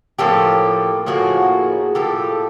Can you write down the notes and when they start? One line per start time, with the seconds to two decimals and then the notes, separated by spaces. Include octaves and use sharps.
0.19 A2 F3 A#3 G4 A4
1.06 A2 F3 A#3 F#4 G#4
1.95 A2 F3 A#3 G4 A4